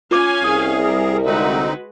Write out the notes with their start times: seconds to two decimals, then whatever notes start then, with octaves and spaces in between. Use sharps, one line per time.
0.11 C#4 F4 F5 G#5 D6
0.44 C2 G#4 D#6
0.81 G3 A#4
1.25 D3 G#3 C4 D#4 F#4 B4